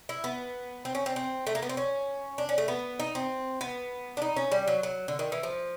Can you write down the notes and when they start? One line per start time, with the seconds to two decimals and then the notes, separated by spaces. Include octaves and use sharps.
0.09 E4
0.24 B3
0.85 C4
0.95 C#4
1.06 C4
1.16 C4
1.47 A3
1.55 A#3
1.62 B3
1.69 C4
1.77 C#4
2.38 D4
2.49 C#4
2.58 A3
2.68 B3
3.00 D#4
3.15 C4
3.61 B3
4.17 D4
4.22 D#4
4.37 C#4
4.52 G3
4.67 F#3
4.83 F#3
5.08 D3
5.19 D#3
5.32 E3
5.43 F3